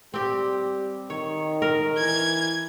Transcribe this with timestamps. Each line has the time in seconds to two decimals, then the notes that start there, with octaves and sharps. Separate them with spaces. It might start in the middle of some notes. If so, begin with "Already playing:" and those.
0.14 G3 C4 G4
1.10 D#3 C#5
1.62 A#4
1.99 E3 G#6